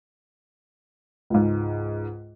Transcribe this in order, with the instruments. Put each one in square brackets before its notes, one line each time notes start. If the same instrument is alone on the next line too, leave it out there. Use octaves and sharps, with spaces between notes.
[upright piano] C#2 G#2